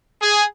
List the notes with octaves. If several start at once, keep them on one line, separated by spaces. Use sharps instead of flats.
G#4